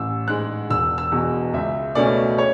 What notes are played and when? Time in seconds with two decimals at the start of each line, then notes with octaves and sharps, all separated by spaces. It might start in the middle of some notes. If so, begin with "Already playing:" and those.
Already playing: A1 E6
0.28 G#2 G#3 F#6
0.70 E1 E6
0.98 E6
1.11 E2 B2
1.54 C#2 E5
1.95 B2 A3 C#4 D5
2.38 C#5